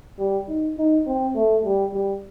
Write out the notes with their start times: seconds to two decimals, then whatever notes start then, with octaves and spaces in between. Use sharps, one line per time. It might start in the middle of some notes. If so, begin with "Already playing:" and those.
0.19 G3
0.48 D#4
0.77 D#4
1.07 C4
1.35 A3
1.64 G3
1.93 G3